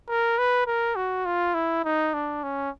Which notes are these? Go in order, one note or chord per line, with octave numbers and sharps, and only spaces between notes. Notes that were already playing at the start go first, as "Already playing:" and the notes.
A#4
B4
A#4
F#4
F4
E4
D#4
D4
C#4